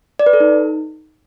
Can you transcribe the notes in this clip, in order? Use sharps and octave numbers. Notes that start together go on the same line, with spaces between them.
D5
B4
A4
D#4